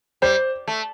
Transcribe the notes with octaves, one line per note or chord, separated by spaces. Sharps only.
G3 C5
A3